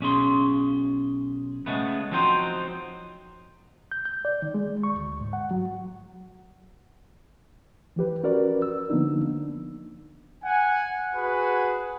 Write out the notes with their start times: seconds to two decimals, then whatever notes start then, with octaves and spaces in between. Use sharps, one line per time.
0.01 B1 C#4 G#4 C6
1.66 C#3 G#3 A3 B3
2.11 F3 F#3 C4 D#4 C5
3.92 G6
4.05 G6
4.25 D5
4.42 D#3
4.54 G#3
4.83 C#6
4.96 D2
5.21 G#2
5.33 F#5
5.51 F#3
7.96 E3 F3 G4 B4
8.23 C#4 F#4 A#4 B4 D5
8.62 E6
8.90 D3 F3 A#3 B3 D4 D#4
10.44 F#5 G#5
11.16 F#4 G#4 B4